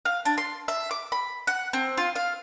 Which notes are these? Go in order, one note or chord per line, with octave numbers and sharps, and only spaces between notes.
F5
D4
C6
E5
D6
B5
F#5
C4
F4
F5